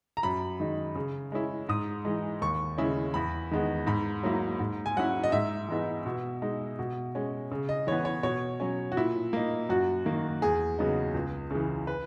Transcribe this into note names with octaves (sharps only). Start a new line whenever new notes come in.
A#5
F#2 B5
D#3 G#3 D#4
C#3
G#3 C#4 E4
G#2 D#6
E3 G#3
D#2 C#6
C#3 G#3 C#4 E4
E2 B5
D#3 G#3 B3
G#2 B5
F#3 A#3 E4
G#2
G#5
F#3 C#4 E4 F#5
D#5
G#2 E5
E3 G#3 B3 D#4
B2
G#3 D#4
B2
G#3 C#4
C#3
D#5
E3 B3 C#5
C#5
B2 C#5
F#3 C#4
F#4
A#2 E4
A#3 D#4
F#2 F#4
D#3 A#3
E2 G#4
C#3 F#3 B3 D#4
C#2
C#3 E3
B4